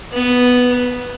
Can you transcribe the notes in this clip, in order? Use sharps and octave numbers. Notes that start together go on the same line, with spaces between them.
B3